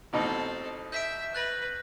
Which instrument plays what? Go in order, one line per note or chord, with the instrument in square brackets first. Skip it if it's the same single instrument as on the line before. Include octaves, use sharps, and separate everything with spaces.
[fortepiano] A1 B2 D#4 [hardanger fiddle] C4 A4
[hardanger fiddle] E5 [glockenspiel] G6 B6 D7
[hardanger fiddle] B4 [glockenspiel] F#6 A6 A#6